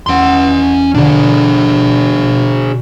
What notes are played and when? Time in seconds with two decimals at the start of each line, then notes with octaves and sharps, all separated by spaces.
0.07 E2 C#4 F#5 C6
0.95 B2 D3 D4 G#4